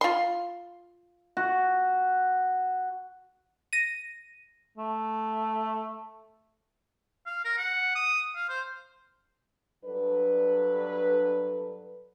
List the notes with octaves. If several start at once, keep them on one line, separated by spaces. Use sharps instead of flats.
F4 C6
F#4
A#6 D#7
A3
F5
A#4
F#5
D#6
F5
C5
G2 F#3 D4 A4 B4